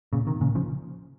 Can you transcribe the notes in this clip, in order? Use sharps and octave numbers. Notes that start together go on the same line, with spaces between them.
A#2 C#3
C3 D#3
A#2 C#3
C#3 F3